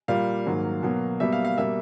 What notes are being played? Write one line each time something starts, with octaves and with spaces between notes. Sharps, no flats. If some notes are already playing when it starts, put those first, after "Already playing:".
A#2 G3 A#3 F5
G#2 D#3 F#3 A#3
B2 F#3 A#3
B2 G3 A#3 E5
F5
F5
B2 G3 A#3 E5